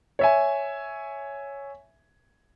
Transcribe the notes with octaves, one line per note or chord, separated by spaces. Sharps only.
C#5 E5 G#5